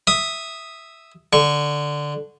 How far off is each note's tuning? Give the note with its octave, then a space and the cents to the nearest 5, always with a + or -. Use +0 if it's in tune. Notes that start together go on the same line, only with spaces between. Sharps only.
E5 +0 D#6 +0
D3 +0 C#6 -10